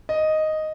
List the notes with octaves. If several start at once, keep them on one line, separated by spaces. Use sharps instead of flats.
D#5